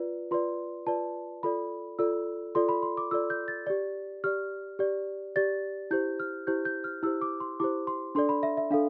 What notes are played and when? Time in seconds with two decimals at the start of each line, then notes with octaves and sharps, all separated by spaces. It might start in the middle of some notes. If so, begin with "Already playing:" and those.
Already playing: F4 B4 D5
0.31 F4 B4 D5 C6
0.87 F4 B4 D5 A5
1.43 F4 A4 D5 B5
1.99 F4 A4 D5 E6
2.55 F4 A4 D5 C6
2.69 B5
2.83 C6
2.97 D6
3.11 F4 A4 D5 E6
3.30 G6
3.48 A6
3.67 G4 D5
4.24 G4 D5 F6
4.79 G4 D5
5.36 G4 D5 A6
5.91 E4 G4 C5 G6
6.20 F6
6.47 E4 G4 C5 G6
6.65 G6
6.84 F6
7.03 E4 G4 C5 E6
7.21 D6
7.40 C6
7.60 E4 G4 C5 D6
7.87 C6
8.15 D4 A4 D5 C6
8.29 B5
8.43 E5
8.57 E5
8.71 D4 A4 F5